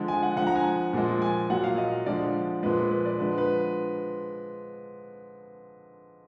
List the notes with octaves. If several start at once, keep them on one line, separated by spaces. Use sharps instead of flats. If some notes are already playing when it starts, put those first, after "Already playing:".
Already playing: D3 F3 G#3
G#5
F#5
D3 F3 G#3 F#5
A#5
G#5
A#2 F3 G#3
G#5
A#2 F#3 F#5
F5
D#5
D3 F3 G#3 D5
A#2 F3 G#3 B4
B4
D5
D3 F3 G#3 B4
B4